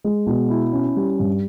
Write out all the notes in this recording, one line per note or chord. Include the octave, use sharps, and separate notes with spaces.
G#3
B2
E4
C#4
G3
G2